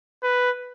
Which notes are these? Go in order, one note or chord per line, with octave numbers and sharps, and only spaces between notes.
B4